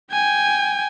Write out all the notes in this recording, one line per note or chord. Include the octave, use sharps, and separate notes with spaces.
G5 G#5